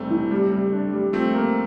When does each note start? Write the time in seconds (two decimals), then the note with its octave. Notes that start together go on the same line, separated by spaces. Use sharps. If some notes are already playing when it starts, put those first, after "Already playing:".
Already playing: F1 G3 A3 C4
0.10 E3
0.31 G3
0.52 G3
0.72 D4
0.93 G3
1.13 F3 A3 C4
1.34 A#3